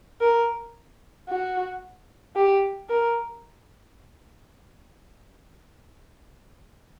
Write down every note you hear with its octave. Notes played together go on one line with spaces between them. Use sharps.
A#4
F#4
G4
A#4